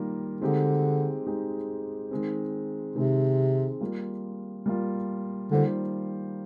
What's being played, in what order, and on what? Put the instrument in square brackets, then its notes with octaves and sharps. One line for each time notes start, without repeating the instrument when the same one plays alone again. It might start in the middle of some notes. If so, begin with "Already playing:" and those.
Already playing: [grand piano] D#3 G3 A#3 F4
[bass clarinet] D3 [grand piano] G#3 C4 D#4 G4
[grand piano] G#3 C4 D#4 G4
D#3 G#3 C4
[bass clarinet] C3 [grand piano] D#3 G#3 C4
[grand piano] G3 A#3 F4
G3 A#3 F4
[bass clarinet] D3 [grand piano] D#3 G3 A#3 F4 C5